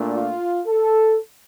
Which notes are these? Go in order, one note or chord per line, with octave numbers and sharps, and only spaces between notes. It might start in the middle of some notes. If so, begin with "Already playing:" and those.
Already playing: A#2 A3 D4
F4
A4